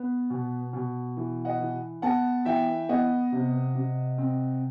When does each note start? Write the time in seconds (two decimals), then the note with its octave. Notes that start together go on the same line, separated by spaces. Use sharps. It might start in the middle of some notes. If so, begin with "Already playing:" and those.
Already playing: B3
0.30 B2
0.73 B2
1.17 E3
1.45 D#5 F#5
1.60 E3
2.02 B3 F#5 A5
2.45 E3 E5 G5
2.89 B3 D#5 F#5
3.32 C3
3.75 C3
4.18 C4